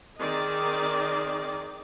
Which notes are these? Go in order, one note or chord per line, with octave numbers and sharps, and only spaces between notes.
D#3 C4 G#4 D5 D#5